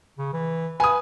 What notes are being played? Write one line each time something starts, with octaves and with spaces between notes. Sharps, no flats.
C#3
E3
B4 G#5 D#6